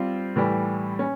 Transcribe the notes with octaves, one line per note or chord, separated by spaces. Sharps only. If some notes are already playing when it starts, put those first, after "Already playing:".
Already playing: G3 C4 F4
A2 E3 G3
C#4